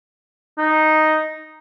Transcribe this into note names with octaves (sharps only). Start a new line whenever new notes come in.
D#4